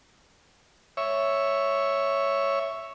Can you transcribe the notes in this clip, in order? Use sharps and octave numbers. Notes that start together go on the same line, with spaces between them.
C#5 E5